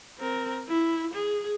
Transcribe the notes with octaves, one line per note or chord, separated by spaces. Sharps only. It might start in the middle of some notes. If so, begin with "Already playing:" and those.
C4 A#4
E4
G#4